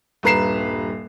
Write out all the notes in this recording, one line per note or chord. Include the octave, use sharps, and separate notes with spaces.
D#1 G2 B4 A#5 C7 E7